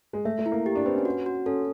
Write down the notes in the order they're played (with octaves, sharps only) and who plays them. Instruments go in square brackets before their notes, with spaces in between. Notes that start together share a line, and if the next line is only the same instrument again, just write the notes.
[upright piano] G#3
[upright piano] A3 [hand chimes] E5
[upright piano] A3
[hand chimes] E4
[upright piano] A#3
[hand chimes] G4
[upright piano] D4
[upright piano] C4 [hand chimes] B4
[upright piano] C#4
[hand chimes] F#4
F#4
[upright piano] C#4 [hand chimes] A4